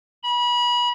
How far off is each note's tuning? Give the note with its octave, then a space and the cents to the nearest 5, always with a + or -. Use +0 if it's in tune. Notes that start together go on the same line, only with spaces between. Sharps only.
B5 -30